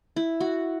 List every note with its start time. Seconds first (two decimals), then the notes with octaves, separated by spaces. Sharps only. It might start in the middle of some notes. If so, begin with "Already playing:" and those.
0.16 E4
0.40 F#4